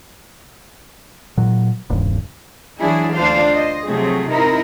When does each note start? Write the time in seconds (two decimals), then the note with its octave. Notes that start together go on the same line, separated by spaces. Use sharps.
1.37 A#2 F#3
1.90 D#1 C2 G2
2.79 E3 F#3 D4 E4 G#4
3.15 D2 D4 F4 C5 F5
3.55 C5 D#5
3.83 C3 F3 F#3 A3 C4 G#4
4.31 C4 D#4 E4 A#4